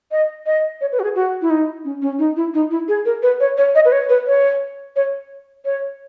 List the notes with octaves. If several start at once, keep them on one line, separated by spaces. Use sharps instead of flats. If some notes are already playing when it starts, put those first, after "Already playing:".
D#5
D#5
C#5
B4
F#4
G#4
F#4
E4
D#4
C#4
C#4
D#4
E4
D#4
E4
G#4
A#4
B4
C#5
C#5
D#5
B4
C#5
B4
C#5
C#5
C#5